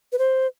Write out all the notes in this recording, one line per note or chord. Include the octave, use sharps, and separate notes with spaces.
B4
C5